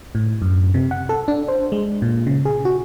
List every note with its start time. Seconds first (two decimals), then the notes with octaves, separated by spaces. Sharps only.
0.15 A2
0.42 F#2
0.74 C3
0.91 F#5
1.09 A4
1.28 D4
1.48 C5
1.72 G#3
2.02 A#2
2.27 C#3
2.45 G#4
2.65 F#4